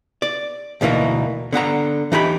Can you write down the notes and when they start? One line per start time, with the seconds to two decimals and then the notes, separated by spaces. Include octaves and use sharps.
0.22 D5
0.81 D2 B2 E3 A#3 D#4
1.53 D3 B3 F#5 A#5
2.12 E3 D#4 G4 B5